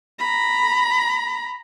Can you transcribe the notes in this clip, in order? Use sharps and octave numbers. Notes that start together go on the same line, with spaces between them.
A#5 B5